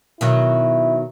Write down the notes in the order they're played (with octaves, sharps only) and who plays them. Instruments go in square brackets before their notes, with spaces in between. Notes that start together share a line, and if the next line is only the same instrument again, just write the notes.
[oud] B2 D#3 F#3 [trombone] E4